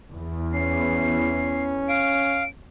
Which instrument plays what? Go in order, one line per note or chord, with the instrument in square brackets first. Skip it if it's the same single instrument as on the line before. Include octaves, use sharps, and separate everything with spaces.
[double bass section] E2
[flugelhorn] C#4 [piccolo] C7
[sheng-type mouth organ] F5 [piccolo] D7